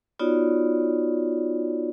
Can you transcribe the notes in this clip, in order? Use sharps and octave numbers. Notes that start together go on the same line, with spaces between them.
B3 D#4 F4 F#4 C#5 D5